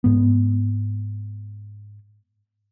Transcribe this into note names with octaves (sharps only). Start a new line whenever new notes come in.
G#2 B3